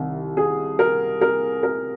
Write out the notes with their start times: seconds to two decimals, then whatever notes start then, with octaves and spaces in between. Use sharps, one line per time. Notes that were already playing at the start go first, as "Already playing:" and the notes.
Already playing: C2 C3 D#3
0.37 G#4
0.79 A#4
1.21 A#4
1.63 A#4